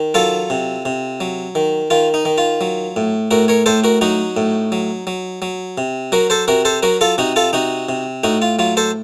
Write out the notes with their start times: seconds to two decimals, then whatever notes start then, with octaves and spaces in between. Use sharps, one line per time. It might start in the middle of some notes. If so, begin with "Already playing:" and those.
Already playing: D#3
0.14 F#3 F4 A4
0.50 C3
0.85 C3
1.20 F#3
1.55 D#3
1.90 D#3 F4
2.14 D#4
2.25 D#3
2.38 F4
2.61 F#3
2.96 A2
3.31 A2 F#4 A#4
3.48 A#4 C#5
3.66 A2 A4 C5
3.84 F#4 A#4
4.01 F#3 D#4 F#4
4.37 A2
4.72 F#3
5.07 F#3
5.42 F#3
5.78 C3
6.12 F#3 F#4 A#4
6.30 A4 C5
6.48 C3 F#4 A#4
6.65 A4 C5
6.83 F#3 F#4 A#4
7.01 F4 A4
7.18 C3 D#4 F#4
7.36 F4 A4
7.53 C3 D#4 F#4
7.89 C3
8.24 A2 D#4 F#4
8.42 F4
8.59 F#3 F4
8.77 A4 C5